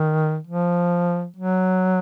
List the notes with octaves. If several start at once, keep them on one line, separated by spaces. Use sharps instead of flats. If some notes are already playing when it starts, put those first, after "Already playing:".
Already playing: D#3
F3
F#3